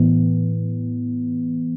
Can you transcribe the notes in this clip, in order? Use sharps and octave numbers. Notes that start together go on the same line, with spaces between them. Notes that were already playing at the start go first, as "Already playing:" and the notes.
Already playing: A2 E3 B3